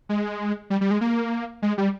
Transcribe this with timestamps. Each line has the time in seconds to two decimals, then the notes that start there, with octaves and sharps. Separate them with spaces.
0.09 G#3
0.70 G3
0.81 G3
0.91 G#3
1.01 A#3
1.62 G#3
1.78 G3